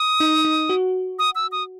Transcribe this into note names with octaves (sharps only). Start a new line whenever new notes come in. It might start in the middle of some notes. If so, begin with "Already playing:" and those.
Already playing: D#6
D#4
D#4
F#4
D#6
E6
D#6